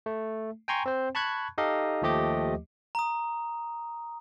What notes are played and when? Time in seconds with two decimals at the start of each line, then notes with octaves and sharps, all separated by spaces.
0.06 A3
0.68 G5 G#5 A#5 C6 C#6
0.86 C4 C5
1.15 A5 B5 C#6 F#6 G#6
1.58 D#4 G4 A4 D#5 F5
2.02 D#2 F3 A3 G4 D#5 D6
2.95 A#5 D#6